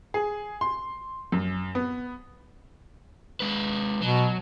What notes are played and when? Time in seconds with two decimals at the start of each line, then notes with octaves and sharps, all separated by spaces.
0.14 G#4
0.61 C6
1.32 F#2
1.75 B3
3.40 G#3 B4
4.02 B2 F#3